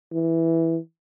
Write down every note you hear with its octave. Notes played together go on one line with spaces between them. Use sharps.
E3